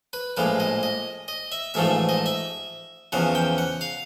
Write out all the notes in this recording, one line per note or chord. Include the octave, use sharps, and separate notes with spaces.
B4
A#1 A2 F3 G#3 B4
D#5
D#5
D#5
E5
A1 G#2 F3 A3 E5
D#5
E5
E2 C#3 F3 F#5
G5
F#5
F5